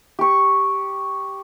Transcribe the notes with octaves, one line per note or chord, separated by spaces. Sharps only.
G4 C#6